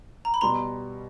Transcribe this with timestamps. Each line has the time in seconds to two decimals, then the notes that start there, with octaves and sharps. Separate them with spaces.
0.25 A#5
0.34 B5
0.41 B2 G3 B3 A#5 C6